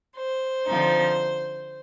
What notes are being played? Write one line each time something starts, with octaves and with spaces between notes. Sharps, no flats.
C5
D3 F3 C4 D#4